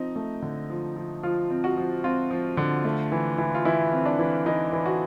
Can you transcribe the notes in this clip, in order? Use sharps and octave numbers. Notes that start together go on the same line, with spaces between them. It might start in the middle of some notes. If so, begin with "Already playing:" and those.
Already playing: F3 C4 D#4
A3
D3
F3
F3
F3 F4
C4
F#4
F3
C4 F4
F3
D3
A3
E3
E3
F4
E3 E4
C4
D4
E3
E3 D#4
E3
F#4